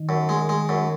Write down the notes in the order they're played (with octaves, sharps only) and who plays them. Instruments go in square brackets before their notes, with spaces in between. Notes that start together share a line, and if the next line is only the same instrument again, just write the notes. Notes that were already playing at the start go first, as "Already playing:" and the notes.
Already playing: [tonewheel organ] D#3
[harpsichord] F#2
G#3
G#3
F#2